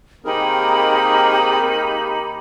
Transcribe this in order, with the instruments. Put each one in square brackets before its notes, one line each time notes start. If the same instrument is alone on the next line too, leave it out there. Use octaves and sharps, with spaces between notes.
[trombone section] D#3 A#3 [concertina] C4 G#4 A#4 [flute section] D#4 G4 B5